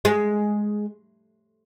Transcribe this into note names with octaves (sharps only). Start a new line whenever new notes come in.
G#3